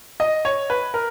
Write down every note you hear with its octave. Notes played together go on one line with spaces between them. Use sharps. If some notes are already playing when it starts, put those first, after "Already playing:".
D#5
C#5
B4
A#4